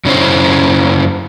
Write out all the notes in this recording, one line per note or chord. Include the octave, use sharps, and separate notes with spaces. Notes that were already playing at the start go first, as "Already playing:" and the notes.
F#2 C#3 C#4 E4 C5